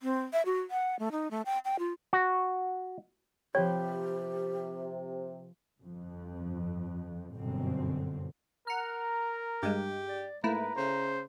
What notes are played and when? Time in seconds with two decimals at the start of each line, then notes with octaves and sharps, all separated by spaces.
0.03 C4
0.33 E5
0.46 F#4
0.71 F#5
0.99 A3
1.12 D#4
1.31 A3
1.46 G5
1.65 G5
1.79 F4
2.13 F#4
3.55 C3 F3 G4 B4 C#5 G5
5.80 G1 F2
7.33 G1 F#2 B2 D3 C4
8.67 A#4 F#5 A#5 F6
9.63 G2 G#3 G4
10.09 D5
10.44 G#2 A3 A#3 E4 B4 A#5
10.76 C#3 C5